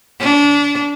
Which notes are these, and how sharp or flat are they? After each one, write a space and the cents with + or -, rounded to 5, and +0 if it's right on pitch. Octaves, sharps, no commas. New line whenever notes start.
D4 -30